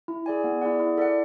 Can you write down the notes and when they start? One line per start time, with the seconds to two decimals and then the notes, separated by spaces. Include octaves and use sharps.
0.08 E4
0.26 G#4 D5 G#5
0.44 B3
0.62 E4 G#4 D5 F#5
0.80 E4
0.98 A4 D5 F#5